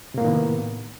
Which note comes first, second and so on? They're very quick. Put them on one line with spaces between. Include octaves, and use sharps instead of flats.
C3 A#3 A2 D#3 B3